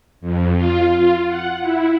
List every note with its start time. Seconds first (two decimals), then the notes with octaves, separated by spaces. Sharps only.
0.21 F2
0.55 F4
0.97 F4
1.27 F#5
1.61 E4